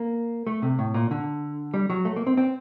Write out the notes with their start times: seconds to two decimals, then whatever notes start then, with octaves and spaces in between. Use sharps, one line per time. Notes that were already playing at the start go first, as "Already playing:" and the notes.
Already playing: A#3
0.47 A3
0.62 C3
0.79 A2
0.94 A#2
1.11 D3
1.74 G3
1.90 F#3
2.05 A3
2.16 A#3
2.27 C4
2.37 C4